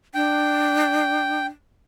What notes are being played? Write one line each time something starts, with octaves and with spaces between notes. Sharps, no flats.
D4 G5